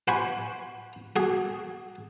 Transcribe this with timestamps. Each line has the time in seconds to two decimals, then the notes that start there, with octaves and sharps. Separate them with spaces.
0.08 C5 F#5 G#5 B5 C#6
1.16 F#4 G#4